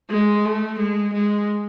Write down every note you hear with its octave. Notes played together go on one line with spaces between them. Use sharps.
G#3
A3
G#3
G#3